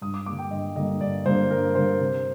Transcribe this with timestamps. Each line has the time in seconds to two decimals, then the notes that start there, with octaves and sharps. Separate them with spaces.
0.01 G2 D#6
0.14 D6
0.26 D3 G3 A#3 D6
0.39 G5
0.51 G2 D#5
0.76 D3 G3 A#3 D#5
1.01 G2 D5
1.26 D3 G3 A#3 C5
1.51 G2 A#4
1.75 D3 G3 A#3 C5
2.00 C3